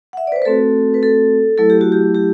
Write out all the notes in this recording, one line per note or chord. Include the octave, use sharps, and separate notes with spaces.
F#5
E5
B4 D5
C5
B4
A3 C4 F#4 A4
B4
A4
F#3 A3 E4 A4
G4
F#4
G4
G4